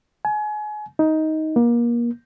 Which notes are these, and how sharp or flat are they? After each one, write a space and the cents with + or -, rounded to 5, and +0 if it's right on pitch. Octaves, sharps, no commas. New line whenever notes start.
G#5 +30
D#4 +10
A#3 +30